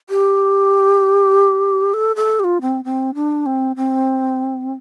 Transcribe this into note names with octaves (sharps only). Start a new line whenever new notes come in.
G4
A4
A4
G4
F4
C4
C4
D4
C4
C4